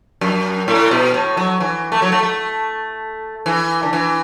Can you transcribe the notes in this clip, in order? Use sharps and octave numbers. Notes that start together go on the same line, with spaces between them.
F#2
A2
B2
A2
F#3
E3
A3
F#3
A3
A3
E3
D3
E3